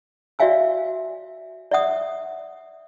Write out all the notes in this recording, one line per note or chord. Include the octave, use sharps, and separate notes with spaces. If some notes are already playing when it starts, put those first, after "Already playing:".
F#4 D5 E5 F5 G#5 E6
D5 E5 F#5 D#6